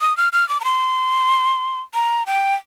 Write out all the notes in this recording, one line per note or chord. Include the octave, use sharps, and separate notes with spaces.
D#6
F6
F6
D6
A#5
C6
A#5
G5